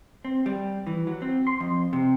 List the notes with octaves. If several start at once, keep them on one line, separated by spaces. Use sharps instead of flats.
C4
G3
E3
F#3
C4
C6
F2
C3